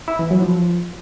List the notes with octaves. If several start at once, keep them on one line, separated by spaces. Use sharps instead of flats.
E4
E3
F#3
F3